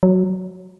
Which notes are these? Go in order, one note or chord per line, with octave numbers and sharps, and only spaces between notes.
F#3